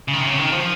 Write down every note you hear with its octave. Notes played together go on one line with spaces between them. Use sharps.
C#3
D#3
C3
C#3
D#3
F3